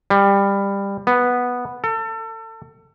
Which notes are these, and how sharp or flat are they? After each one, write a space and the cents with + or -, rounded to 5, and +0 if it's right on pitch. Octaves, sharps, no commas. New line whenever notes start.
G3 +20
B3 -5
A4 +30